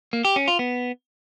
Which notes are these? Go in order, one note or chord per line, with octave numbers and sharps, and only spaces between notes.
A#3
G4
C#4
F4
B3